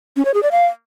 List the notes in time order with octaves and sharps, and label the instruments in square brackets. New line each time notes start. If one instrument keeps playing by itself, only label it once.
[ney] C#4
C#5
G#4
D5
F5